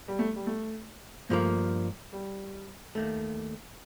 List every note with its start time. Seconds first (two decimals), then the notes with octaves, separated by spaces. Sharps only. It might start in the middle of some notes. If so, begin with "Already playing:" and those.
0.08 G3
0.19 A3
0.36 G3
0.47 A3
1.29 G2 F3 A3 A#3
2.13 G3
2.95 D#2 D#3 A3